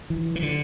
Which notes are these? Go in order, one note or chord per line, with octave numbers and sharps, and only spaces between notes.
E3
E3
D3